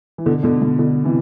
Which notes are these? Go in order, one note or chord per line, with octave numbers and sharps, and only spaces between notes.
E3
B2 D3
B2 D3
B2
B2 D3
C3 E3